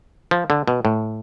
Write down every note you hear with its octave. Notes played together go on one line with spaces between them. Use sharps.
F3
D3
B2
A2